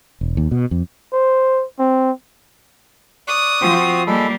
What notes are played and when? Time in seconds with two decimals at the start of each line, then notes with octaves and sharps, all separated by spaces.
0.21 E1
0.37 D#2
0.51 B2
0.71 F2
1.13 C5
1.79 C4
3.28 D5 C#6 D#6 F#6
3.61 F3 C4 F#4 C5
4.07 G3 G#3 A#3 A4 B5